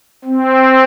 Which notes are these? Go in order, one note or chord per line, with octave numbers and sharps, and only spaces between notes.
C4